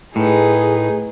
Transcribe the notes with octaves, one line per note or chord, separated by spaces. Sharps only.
A2 D#4 G#4 B4